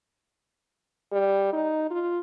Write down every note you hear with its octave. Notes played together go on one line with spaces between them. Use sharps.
G3
D#4
F4